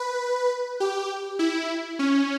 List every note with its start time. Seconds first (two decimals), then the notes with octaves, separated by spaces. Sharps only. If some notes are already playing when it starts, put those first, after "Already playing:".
Already playing: B4
0.80 G4
1.39 E4
1.99 C#4